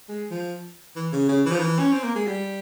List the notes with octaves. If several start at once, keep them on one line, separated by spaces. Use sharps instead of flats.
G#3
F3
E3
C#3
C#3
E3
F3
E3
C#4
C4
A#3
G#3
G3